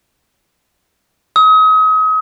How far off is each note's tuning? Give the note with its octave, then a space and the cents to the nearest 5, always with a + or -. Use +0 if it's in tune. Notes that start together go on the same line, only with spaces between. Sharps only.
D#6 +35